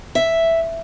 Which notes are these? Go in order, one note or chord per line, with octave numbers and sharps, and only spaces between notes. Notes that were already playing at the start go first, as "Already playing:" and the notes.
E5